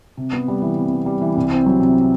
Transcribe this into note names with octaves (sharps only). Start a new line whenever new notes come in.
C3
B3
G3
E3
C3
B3
G3
E3
C2
C4
F#3
C3